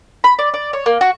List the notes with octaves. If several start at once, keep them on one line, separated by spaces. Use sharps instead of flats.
B5
D5
D5
C#5
A#3
F#4